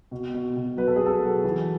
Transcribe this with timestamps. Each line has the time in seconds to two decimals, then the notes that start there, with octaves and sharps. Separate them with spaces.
0.11 B2
0.34 B2
0.56 B2
0.77 F#3 B4
0.87 A4
0.96 G#4
1.01 B2
1.06 A4
1.23 F#3
1.44 E3